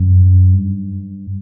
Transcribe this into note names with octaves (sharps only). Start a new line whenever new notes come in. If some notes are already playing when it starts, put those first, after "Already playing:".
Already playing: F#2
G2